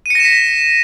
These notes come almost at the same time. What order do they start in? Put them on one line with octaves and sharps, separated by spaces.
D#7 C#7 A#6 E7 B6